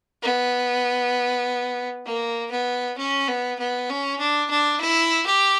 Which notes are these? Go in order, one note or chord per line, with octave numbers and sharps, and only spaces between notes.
B3
A#3
B3
C#4
B3
B3
C#4
D4
D4
E4
G4